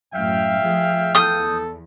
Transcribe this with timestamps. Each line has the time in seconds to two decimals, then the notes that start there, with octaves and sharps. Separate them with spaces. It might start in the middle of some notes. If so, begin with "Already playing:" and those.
0.14 F#2 A2 E5 F5 G5
0.63 F3 A3 G#4
1.15 E2 A4 D#6 G6